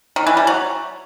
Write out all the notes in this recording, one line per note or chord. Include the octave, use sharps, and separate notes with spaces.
D#3
E3
G3
F#3